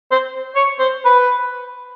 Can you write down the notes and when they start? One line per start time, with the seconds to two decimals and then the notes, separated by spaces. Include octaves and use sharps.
0.11 C5
0.55 C#5
0.79 C5
1.05 B4